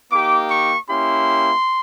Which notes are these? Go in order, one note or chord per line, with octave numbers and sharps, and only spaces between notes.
A#3 D#4 G4 D6
C#6
A#3 C#4 E4 G4 C6